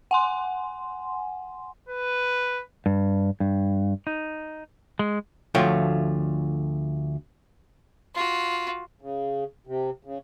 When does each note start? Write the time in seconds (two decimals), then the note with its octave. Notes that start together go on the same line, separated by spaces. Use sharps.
0.11 F#5 G#5 C6
1.89 B4
2.86 G2
3.40 G2
4.07 D#4
4.99 G#3
5.55 D2 F3 A3 F4 C#5 G5
8.15 F4 F#4
9.01 C#3
9.67 C3
10.05 C#3